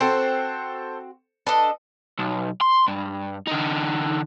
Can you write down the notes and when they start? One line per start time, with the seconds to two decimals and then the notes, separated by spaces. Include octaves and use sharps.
0.01 C4 F#4 A4 C5
1.47 D4 A4 B4 D#5 A5
2.19 B1
2.61 C6
2.88 G2
3.47 D3 D#4